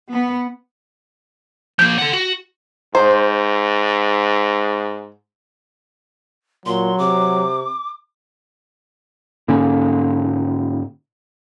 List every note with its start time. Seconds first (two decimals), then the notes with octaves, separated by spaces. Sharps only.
0.10 B3
1.79 F3 A#3 G6
1.98 A4 F#5
2.13 F#4
2.95 G#2 C5
6.66 A#2 F#3 C6
6.98 C3 D6
9.48 G#2 D3 A#3 C#4